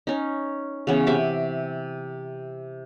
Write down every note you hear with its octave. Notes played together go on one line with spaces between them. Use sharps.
C#4 D#4
C#3 E3 B3 C#4
C3 E5 D6